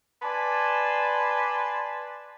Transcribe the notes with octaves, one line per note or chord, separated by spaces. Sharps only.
B4 D5 G#5 A5 C6